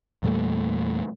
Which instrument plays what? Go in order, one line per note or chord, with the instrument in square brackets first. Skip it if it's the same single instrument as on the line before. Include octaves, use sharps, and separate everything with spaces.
[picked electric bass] E2 A#2 G3 A3